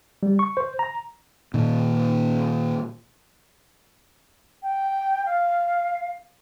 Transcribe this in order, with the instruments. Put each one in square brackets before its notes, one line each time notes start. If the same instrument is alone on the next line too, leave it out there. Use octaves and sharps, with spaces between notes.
[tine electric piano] G3
C#6
C5
A#5
[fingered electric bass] A#2 D#3
[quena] G5
F5